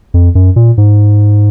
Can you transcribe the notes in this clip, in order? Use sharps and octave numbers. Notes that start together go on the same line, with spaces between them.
F2
F#2
A#2
G#2